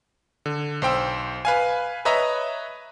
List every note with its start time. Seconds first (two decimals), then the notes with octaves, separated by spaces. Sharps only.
0.46 D3
0.82 B1 C5 G5 E6
1.45 B4 F5 G#5
2.05 B4 C#5 D#5 E5 A#5